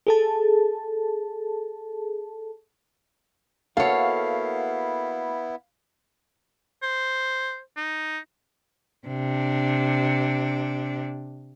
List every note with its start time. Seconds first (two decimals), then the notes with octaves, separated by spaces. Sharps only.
0.07 G#4 A4 A5
3.77 A#3 B3 E4 F#4 A4 C#5 F5
6.83 C5
7.77 D#4
9.07 C3 D4